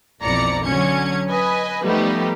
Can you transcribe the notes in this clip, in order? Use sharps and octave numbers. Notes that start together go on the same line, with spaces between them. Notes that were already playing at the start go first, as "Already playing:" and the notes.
B1 F2 E3 D5 A#5 C#7
D3 F#3 C#4 G#6 C#7
B4 D#5 G#5
F3 G3 A3 B3 D#4 G4